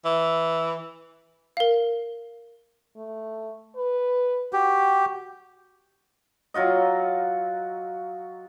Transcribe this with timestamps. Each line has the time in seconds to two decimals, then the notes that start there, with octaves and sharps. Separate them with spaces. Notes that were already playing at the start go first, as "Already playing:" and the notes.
0.05 E3
1.57 A#4 F5
2.96 A3
3.76 B4
4.53 F#4 G4
6.54 F#3 F4 F#4 D#5